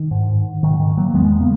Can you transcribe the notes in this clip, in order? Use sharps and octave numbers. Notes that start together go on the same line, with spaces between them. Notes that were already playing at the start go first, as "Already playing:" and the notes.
Already playing: D#3
G#2
G#2 D#3
D#3
F#3 A#3
E2 G#3 B3
C#3 A#3